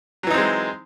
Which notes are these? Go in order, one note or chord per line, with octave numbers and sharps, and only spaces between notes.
E3 F#3 G#3 C4 D#4